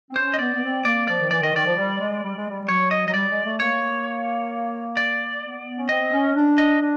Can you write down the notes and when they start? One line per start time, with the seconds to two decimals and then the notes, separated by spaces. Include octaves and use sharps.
0.10 C4
0.16 C#4 C5
0.34 D#5
0.39 B3 D5
0.54 B3
0.62 C4
0.85 A#3 D5
1.07 F3 D5
1.20 D#3
1.30 E3 D5
1.42 D#3 D#5
1.53 D#3 D5
1.65 F3
1.76 G3
1.99 G#3
2.23 G3
2.36 G#3
2.48 G3
2.61 G3
2.67 F#3 C#5
2.91 D#5
3.07 F#3 D#5
3.14 G3 D5
3.29 G#3
3.44 A3
3.60 A#3 C#5
4.97 D5
5.43 B3
5.76 C#4
5.89 C4 D#5
6.12 C#4
6.35 D4
6.58 D#5
6.80 D4